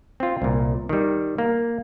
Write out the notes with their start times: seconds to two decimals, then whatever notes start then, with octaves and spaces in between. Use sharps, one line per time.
0.20 C4 F4
0.42 C2 A#2
0.89 D#3 G3
1.38 A#3